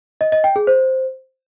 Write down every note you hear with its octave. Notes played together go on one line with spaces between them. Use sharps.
D#5
D#5
G5
G#4
C5